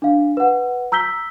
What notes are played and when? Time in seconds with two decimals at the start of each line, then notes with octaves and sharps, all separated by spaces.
0.02 D4 F5
0.37 B4 F#5
0.92 A#5 E6 G6 B6 G7